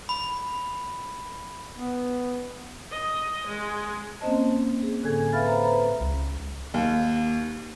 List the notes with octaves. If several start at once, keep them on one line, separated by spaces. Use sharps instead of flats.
B5
B3
D#5
G#3
A#3 C4 C#4 C5 D#5 A5
G#4
A2 D3 A4 G#5 G#6
B4 E5 F5 B5 F6 A6
C5 A#5 B5
B4 C5 A#5 B5
C#2
D#2